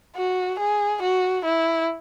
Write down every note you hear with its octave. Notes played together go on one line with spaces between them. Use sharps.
F#4
G#4
F#4
E4